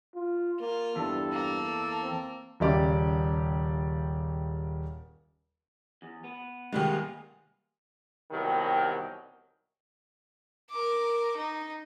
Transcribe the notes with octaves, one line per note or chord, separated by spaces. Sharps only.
F4
A#3 F4
E2 G2 A4
A#3
C4
D#1 C#3 G4 D5
E2
B3
D#3 G3 G#3 A#3 B3 G#4
C2 B2 D#3 E3 F#3 G4
A#4 D6
D#4